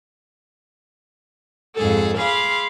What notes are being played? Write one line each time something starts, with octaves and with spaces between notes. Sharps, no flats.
F2 G#2 G#4 A4
G#4 F5 B5 C6 D6